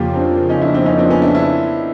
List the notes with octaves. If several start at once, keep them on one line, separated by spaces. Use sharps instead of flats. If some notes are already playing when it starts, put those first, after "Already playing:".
Already playing: F2 C#3 F3 A#3 F4 G4
C4 D4
C#4 D#4
D4 E4
C4 D4
C#4 D#4
C4 D4
B3 C#4
D4 E4
D4 E4